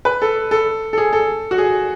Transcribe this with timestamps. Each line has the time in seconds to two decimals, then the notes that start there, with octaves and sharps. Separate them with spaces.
0.05 B4
0.22 A4
0.51 A4
0.93 A4
0.98 G#4
1.13 A4
1.51 F#4
1.58 G#4